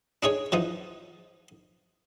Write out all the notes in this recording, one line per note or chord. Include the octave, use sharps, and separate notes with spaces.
D4 D#4 G#4 C#5
E3 F3 D#4